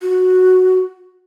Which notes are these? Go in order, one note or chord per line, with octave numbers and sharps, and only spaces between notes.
F#4